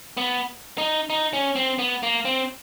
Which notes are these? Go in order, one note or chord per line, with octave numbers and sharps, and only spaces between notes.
B3
D#4
D#4
C#4
C4
B3
A#3
C4